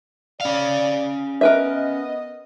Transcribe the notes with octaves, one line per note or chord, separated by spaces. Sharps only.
C#4 D5 F5
B3 A#4 B4 D#5 E5